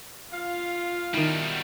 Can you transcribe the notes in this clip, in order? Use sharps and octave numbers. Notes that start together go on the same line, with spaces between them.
F4 F5
B2 D#3 G3 E4